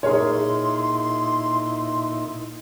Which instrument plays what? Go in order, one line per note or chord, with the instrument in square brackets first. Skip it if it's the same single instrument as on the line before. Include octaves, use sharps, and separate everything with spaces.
[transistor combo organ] A#2 D#4 E4 [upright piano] G#4 A#4 C#5 [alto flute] C6